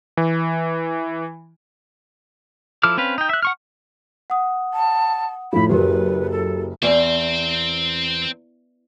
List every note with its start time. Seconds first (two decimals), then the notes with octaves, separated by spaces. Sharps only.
0.17 E3
2.83 F3 E4 A4 D6 F6
2.97 C4 C#4 B4 F5
3.18 D#4 G5
3.29 E5 F#6
3.42 F#5 C#6 F6
4.30 F#5 D#6
4.73 A5
5.53 A2 F3 A4 B5
5.69 F#1 F#4 G4 A#4 B4
6.30 A4
6.82 E2 C4 C5